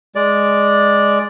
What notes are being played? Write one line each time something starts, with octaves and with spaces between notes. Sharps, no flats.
G#3 D5